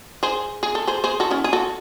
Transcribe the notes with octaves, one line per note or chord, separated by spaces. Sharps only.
G#4 C5
G#4
A4
G#4 C5
G#4 C5
F#4 A4
C#4 E4
G#4
F#4 A4